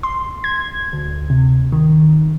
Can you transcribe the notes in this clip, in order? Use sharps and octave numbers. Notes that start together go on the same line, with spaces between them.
C6
G#6
D2
C3
D#3